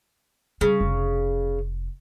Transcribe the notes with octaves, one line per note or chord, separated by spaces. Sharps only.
C#3 G3
F1